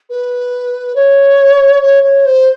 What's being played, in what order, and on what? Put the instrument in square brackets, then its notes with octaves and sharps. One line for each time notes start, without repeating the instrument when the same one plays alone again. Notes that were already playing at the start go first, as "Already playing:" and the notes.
[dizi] B4
C#5
C#5
C#5
C5